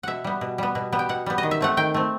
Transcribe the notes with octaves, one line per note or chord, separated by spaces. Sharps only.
B2 E5 F#5
G3 B3
B2
G3 B3
B2
G3 B3
G5
B2 F#5
G3 B3
D#5
D#3
E5
A3 C4 F#5
D#3 G5
A3 C4